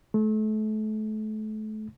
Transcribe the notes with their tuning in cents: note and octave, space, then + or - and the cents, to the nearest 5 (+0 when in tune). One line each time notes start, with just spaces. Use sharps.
A3 -35